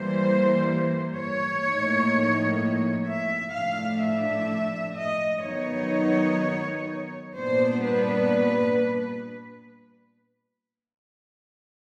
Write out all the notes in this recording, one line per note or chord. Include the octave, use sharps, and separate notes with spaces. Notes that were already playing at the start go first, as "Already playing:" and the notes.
Already playing: E3 G3 A#3 C5
C#5
A2 F3 A#3 D#4
E5
A2 F3 A3 D4 F5
E5
D#5
D#3 F#3 B3 D#4 C#5
A#2 G3 B3 D4 C5
B4